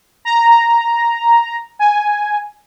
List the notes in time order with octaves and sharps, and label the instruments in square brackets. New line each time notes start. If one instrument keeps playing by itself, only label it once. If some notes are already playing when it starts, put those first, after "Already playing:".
[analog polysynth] A#5
G#5